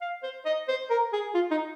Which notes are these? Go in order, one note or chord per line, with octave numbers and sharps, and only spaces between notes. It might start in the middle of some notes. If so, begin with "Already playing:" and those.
F5
C5
D#5
C5
A#4
G#4
F4
D#4